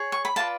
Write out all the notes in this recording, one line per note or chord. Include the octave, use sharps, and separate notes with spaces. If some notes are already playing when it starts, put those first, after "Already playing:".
Already playing: G#4 C#5
C#6
B5
F4 B4 D5 A5